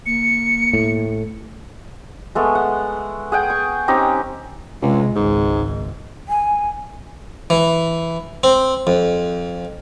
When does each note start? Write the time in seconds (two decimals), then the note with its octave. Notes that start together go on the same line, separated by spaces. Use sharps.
0.06 A#3 C#7
0.73 A2
2.35 G#3 A3 B3
2.55 F#5
3.32 G#4 F#5 G5
3.50 C#6
3.88 C4 C#4 D#4 G4
4.82 C#2 C3 G#3
5.16 G#1 C#2 G#2
6.29 G#5
7.50 E3
8.44 C4
8.87 F2